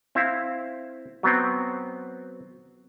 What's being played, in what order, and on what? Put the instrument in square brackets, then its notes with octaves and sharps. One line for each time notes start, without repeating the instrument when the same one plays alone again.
[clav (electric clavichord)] C4 E4 E5 F5
F#3 B3 C4